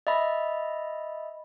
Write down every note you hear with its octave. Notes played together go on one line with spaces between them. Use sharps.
D#5 E5 B5